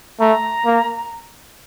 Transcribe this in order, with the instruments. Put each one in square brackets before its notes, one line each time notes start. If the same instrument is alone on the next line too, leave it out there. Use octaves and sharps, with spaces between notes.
[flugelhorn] A3 [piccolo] A#5
[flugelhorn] A#3